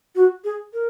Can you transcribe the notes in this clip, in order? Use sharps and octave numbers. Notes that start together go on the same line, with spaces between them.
F#4
G#4
A#4